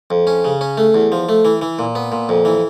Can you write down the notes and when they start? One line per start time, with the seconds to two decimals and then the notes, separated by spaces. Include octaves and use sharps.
0.11 F2
0.27 C#4
0.45 C#3
0.61 C#4
0.78 A3
0.94 E2
1.12 F3
1.29 A3
1.45 E3
1.62 E3
1.79 A#2
1.95 B3
2.12 A#2
2.29 F2
2.45 E3